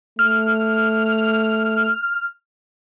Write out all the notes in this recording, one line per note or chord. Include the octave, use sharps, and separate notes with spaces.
A3 F6